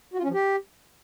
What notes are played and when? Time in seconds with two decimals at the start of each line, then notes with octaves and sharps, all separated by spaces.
0.14 F#4
0.19 F4
0.24 C#4
0.29 F3
0.34 G4